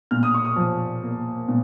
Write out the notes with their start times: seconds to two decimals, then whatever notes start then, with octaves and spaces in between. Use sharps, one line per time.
0.11 A#2 F6
0.23 D#6
0.34 C#6
0.45 D#6
0.56 F3
1.03 A#3
1.48 A#2